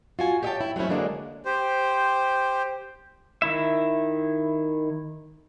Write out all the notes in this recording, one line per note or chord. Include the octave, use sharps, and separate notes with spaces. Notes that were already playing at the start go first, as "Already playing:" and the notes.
F4 F#4 G#5
G4 C#5 D#5 E5 G5 A5
E4
F#3 A3 C4 C#4 E4
D3 F#3 G#3 A#3 C4 D4
G4 C5
D#3 E4 E5